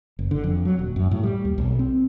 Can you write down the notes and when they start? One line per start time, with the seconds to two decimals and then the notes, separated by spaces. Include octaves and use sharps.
0.19 F#1
0.31 D3
0.44 F2
0.65 F#3
0.79 D#1
0.96 F#2
1.11 A2
1.23 G3
1.45 D#2
1.58 B1
1.79 C4